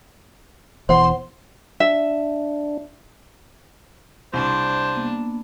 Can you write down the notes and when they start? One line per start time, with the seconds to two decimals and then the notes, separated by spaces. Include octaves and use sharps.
0.89 E1 E2 C5 F#5 C6
1.80 D4 E5
4.33 C2 D4 C5 C6
4.94 A#3 B3